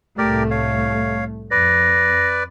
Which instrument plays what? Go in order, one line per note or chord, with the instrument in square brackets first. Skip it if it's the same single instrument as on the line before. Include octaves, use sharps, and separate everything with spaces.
[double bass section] C2 A2 A3 [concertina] G4 A#4 D5
[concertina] C#5 F5
[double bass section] F2 [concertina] B4 D5 [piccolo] A#6